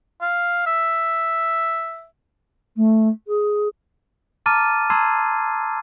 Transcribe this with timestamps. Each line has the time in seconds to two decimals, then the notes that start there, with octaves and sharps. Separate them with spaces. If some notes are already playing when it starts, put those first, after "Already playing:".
0.22 F5
0.66 E5
2.76 A3
3.27 G#4
4.46 A5 A#5 D6 F6 A6 D#7
4.90 A5 A#5 C6 E6 G#6 C7